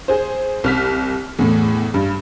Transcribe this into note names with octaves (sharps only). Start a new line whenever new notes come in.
G#4 C5
C2 F6 B6
E2 A2
G2